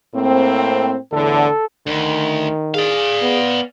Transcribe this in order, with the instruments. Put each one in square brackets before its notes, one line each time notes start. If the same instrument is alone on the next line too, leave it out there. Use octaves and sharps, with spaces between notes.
[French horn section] A2 A#3 C4
[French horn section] E2 A2 D3 [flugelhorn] A4
[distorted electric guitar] D2 [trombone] D#3
[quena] G#4 [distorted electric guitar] D5 F5
[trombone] B3